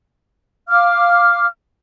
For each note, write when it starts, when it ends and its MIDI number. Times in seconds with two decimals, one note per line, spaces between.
0.69 1.46 77
0.69 1.46 86
0.69 1.46 89